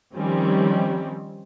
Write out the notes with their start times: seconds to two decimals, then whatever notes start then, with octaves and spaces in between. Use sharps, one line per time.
0.14 D#3 F3 G3 C4 C#4